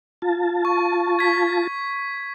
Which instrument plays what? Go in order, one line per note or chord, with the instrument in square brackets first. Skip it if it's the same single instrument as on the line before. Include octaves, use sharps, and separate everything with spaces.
[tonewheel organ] F4 A5
[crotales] C#6
G#6 B6